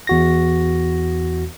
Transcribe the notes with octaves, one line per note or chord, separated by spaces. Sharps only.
E2 F#4 A#6